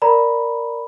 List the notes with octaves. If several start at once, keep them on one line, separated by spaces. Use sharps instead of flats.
A#4 D5 A#5 B5